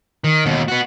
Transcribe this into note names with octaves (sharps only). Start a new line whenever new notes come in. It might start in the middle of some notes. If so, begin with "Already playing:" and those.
D#3
D#2 B2
B3 F#4